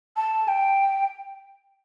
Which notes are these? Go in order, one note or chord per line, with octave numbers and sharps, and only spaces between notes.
A5
G5